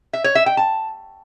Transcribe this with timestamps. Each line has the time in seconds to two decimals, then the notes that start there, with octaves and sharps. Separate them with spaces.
0.13 E5
0.24 C#5
0.35 E5
0.46 G5
0.57 A5